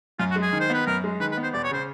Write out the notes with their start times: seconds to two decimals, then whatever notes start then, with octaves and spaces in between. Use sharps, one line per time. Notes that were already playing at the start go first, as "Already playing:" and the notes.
0.19 F#2 F4
0.31 F#4
0.36 G#3
0.42 G#4
0.53 D#3
0.60 C5
0.70 B3 B4
0.87 F#2 A#4
1.04 G#3
1.20 D#3 B4
1.32 B4
1.37 B3
1.43 C5
1.53 E1 D5
1.64 C#5
1.71 C#3 C5